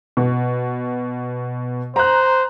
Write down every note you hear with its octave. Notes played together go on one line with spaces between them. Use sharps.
B2
C5 A#5 F#6